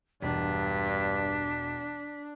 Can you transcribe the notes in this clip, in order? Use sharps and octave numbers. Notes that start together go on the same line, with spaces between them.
E1 G2 D4 B6